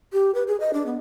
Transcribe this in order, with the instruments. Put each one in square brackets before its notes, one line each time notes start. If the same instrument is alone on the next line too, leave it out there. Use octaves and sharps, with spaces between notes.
[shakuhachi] G4
B4
G#4
D#5
D4
B3